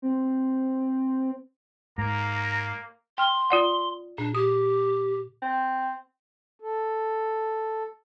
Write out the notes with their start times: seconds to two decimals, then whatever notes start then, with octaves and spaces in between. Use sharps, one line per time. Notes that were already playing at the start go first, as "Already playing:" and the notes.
0.02 C4
1.98 G#2 A#3 A#5
3.18 G5 C6 F6
3.50 F4 D5 F#5
4.18 A#2 D4
4.35 G4 D#6
5.42 C4
6.60 A4